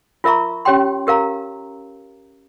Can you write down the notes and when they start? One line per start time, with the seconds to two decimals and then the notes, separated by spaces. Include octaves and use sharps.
0.24 F4 A#4 E5 A#5 C#6
0.65 C#4 G4 C#5 G5 C6
1.07 G4 A#4 F5 A#5